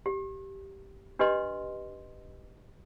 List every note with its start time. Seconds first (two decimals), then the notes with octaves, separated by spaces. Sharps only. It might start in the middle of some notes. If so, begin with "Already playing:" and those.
0.06 G4
1.19 D4 G4 B4 D#5 C6